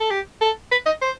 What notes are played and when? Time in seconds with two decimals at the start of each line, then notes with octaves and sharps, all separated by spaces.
0.01 A4
0.11 G4
0.41 A4
0.71 B4
0.86 D#5
1.02 C5